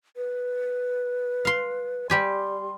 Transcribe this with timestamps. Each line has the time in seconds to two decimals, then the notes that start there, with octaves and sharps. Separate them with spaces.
0.17 B4
1.45 F5 C6
2.10 G3 G4 G#5 C6